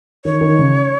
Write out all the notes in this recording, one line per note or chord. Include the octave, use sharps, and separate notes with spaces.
D#3 C#5
D#3
C#3